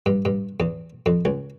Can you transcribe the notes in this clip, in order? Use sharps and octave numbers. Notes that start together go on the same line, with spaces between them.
G2
G2
E2
F2
C#2